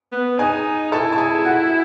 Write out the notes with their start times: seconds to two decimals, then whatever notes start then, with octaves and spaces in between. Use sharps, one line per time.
0.12 B3
0.39 D#4 G#4 G#5
0.91 E4 A4 A5
1.12 A5
1.18 G#4 G#5
1.45 F#4 F#5